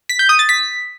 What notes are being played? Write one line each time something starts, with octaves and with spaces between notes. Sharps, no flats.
B6
G6
D#6
A6
B6